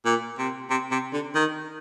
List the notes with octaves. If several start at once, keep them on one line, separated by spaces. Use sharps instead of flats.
A#2
C3
C3
C3
D3
D#3